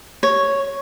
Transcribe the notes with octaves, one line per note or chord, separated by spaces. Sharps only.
C#5